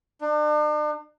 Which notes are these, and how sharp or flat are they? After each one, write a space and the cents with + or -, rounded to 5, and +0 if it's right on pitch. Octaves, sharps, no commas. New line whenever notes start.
D4 +40